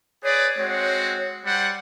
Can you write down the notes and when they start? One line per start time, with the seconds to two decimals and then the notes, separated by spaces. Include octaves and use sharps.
0.24 G#4 B4 C#5 D5
0.58 G#3 C4 F#4
1.45 G3 C5 F#5